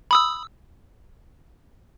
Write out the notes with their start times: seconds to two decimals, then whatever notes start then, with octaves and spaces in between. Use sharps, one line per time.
0.11 B5 D#6 E6